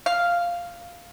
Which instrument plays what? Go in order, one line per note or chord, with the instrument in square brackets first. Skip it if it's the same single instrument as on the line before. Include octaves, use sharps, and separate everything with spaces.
[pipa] F5